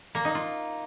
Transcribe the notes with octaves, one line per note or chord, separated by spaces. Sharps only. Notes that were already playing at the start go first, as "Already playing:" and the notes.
A#3
D#4
F4